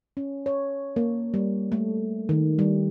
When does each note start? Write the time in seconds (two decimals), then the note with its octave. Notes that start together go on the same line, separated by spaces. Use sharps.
0.17 C#4
0.46 C#5
0.96 A#3
1.34 G3
1.72 A3
2.29 D#3
2.59 G3